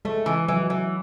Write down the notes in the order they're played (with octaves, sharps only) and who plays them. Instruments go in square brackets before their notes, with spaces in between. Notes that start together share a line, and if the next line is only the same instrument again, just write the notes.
[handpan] G#3 [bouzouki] A3
[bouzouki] E3
[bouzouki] E3 [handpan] F#3
[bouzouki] E3